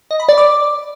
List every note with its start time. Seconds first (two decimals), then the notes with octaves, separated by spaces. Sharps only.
0.11 D#5
0.20 B5
0.29 D5
0.38 D6